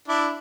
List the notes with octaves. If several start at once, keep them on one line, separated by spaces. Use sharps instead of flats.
D4 E4